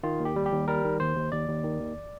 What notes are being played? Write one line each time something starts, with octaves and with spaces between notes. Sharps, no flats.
D#3 F4
D#2
G4
G3
G4
D#2
G3 A#4
D#3
D#2 C5
D#2
D#2 D5
D#2
D#3
D#2